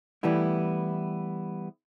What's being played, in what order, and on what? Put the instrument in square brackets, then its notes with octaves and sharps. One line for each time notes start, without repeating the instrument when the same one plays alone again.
[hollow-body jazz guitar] E3 G3 A3 B3 E4